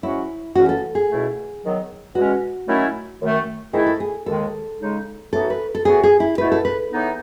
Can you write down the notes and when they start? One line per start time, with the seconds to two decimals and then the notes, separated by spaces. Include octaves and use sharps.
0.03 G#2 F#3 C#4 E4 F#4
0.55 E2 C#3 E3 A3 C#4 F#4
0.69 A4
0.95 G#4
1.09 C#2 B2 A3 E4
1.62 D#3 F#3 B3
2.15 E2 B2 G#3 C#4 F#4
2.67 D#3 F#3 A3 C#4 E4
3.21 F#2 D#3 A3
3.73 G#2 D#3 A3 E4 G#4
3.86 A4
4.00 G#4
4.26 D#2 D#3 G#3 A4
4.79 C#3 G#3 D#4
5.32 A2 E3 B3 D#4 F#4 A4
5.50 B4
5.75 A4
5.85 A2 E3 B3 F#4 G#4
6.03 G#4
6.20 E4
6.38 B2 A3 E4 B4
6.52 A4
6.65 B4
6.92 A2 E3 B3 D#4